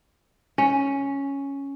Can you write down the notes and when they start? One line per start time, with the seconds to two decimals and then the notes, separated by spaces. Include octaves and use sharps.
0.58 C#4